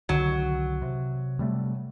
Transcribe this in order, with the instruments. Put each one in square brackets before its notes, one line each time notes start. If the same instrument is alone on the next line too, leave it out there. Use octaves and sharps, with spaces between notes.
[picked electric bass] C2 D3 D#3 [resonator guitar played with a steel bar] F#3
[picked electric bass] C3
C3 G3 A3